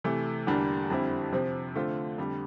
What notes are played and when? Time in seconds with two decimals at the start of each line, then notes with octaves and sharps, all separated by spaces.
0.04 C3 E3 A3
0.47 E2 D3 G3 A#3 D4
0.90 F2 D3 G3 C4 E4
1.32 C3 F3 C4
1.75 D3 A3 C4 F4
2.18 F2 D3 G3